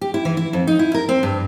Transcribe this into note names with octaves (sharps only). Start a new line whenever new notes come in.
G4
E4
E3
E4
F2
D#4
E4
A#4
C4
G2